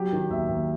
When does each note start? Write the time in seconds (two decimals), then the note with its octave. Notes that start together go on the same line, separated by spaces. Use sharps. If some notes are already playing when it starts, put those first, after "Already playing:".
Already playing: F#3 G4
0.13 D#3
0.30 D#2 E5
0.49 D#2